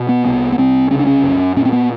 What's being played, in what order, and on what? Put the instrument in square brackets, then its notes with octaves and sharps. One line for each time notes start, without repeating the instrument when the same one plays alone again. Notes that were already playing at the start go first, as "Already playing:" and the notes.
Already playing: [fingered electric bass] B2
B3
C2 B3
B3
C2 C4
C#3 C#4
D4
C#4
F#2
A#2 C#4
C4
B3